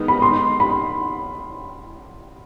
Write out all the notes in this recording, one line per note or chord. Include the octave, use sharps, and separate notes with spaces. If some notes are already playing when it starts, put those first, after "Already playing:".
Already playing: D#3 G#3 B3 D#4
B5
C6
B5